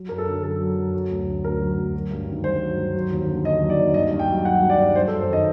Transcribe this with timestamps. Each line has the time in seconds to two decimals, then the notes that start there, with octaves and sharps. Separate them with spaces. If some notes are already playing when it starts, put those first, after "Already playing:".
Already playing: F#3
0.09 F#2 A#4
0.18 A4
0.27 D3
0.43 F#2 A4
0.60 F#3
0.77 F#2
0.93 F#3
1.10 D2
1.28 D3
1.44 D2 A#4
1.61 F#3
1.78 D2
1.95 F#3
2.11 G2
2.28 D#3
2.44 G2 C5
2.61 F#3
2.78 G2
2.94 F#3
3.11 D#2
3.28 D3
3.45 D#2 D#5
3.61 F#3
3.70 D5
3.78 D#2
3.94 G2 D#5
4.11 G2
4.19 G5
4.28 F#3
4.45 F#3 F#5
4.62 G2
4.70 D5
4.78 G2
4.95 F#3 C5
5.08 A4
5.11 F#2
5.20 C5
5.29 D#3 D#5